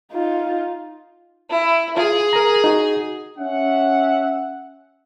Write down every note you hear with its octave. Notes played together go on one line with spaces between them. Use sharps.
D#4 F4
E4
F4 G#4
A#4 A#5
D#4 F#4
C#4 E5 F#5